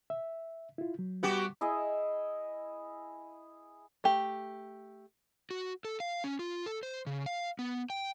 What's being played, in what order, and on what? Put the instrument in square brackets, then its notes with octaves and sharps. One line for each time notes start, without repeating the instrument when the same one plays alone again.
[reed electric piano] E5
E4 F4
F#3
[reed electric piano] G3 D6 [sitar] B3 F#4 G4
[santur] E4 G#4 D#5
[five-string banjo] A3 G4
[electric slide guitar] F#4
A4
F5
C#4
F4
A4
C5
C#3
F5
B3
G5